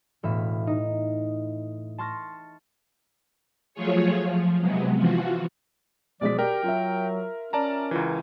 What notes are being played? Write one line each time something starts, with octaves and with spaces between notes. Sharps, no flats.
E1 A2 E5 F5
D#4
A5 C6 C#6 F6 A6 A#6
F3 F#3 A3 F4 G#4 C#5
F3
C3 F#3 G#3 B3
E3 F3 F4 F#4
B1 F3 G#3 D5 B6
G4 A#4 D5 G5
F#3 F4 E5
C#4 A#4 D5 A5 A#5
C#2 E3 F4